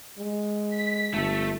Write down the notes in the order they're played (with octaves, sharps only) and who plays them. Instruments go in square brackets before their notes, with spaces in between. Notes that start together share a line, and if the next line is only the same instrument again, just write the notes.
[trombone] G#3
[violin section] B6
[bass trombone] G1 [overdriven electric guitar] A3